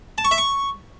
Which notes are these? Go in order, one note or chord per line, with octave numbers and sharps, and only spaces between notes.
A5
C#6
E5
C#6